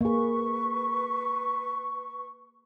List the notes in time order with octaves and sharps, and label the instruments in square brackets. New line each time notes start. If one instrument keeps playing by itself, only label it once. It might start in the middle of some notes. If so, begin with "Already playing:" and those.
[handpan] A#3 G#4 [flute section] B4 C#6